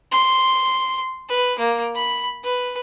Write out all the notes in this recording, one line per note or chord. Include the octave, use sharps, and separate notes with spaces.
C6
B4
A#3
B5
B4